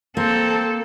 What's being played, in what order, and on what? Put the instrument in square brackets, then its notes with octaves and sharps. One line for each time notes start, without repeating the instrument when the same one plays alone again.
[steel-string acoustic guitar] A#3 [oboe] C4 [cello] A4